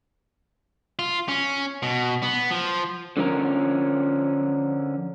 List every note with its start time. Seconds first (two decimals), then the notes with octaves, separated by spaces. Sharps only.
0.99 F4
1.29 C#4
1.83 B2
2.23 B3
2.50 F3
3.17 D3 F3 C#4 A#4